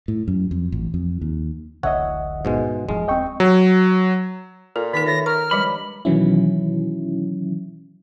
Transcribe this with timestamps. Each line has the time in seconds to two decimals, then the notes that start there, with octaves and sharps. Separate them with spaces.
0.08 A2
0.28 F#2
0.51 F2
0.72 A1
0.94 F2
1.21 D#2
1.83 D1 A1 D3 C#5 D#5 E5 F#5
2.45 G#2 B2 G#3
2.89 F1 A2 F3 G#3
3.08 D#1 C4 D#5 G5 C#6
3.40 F#3
4.76 A#2 A4
4.93 D#3 D#4 A#4 B6
5.06 D#3 A3 C#5 A#6
5.26 A#4 C#6 F6
5.51 G2 F3 G3 G#3 B5
6.05 B2 D#3 E3 F#3 C#4 E4